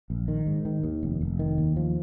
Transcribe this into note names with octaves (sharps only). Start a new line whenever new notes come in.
A#1
D#3
G#2
D#3
D#2
F1
F1
D#3
D#2
F3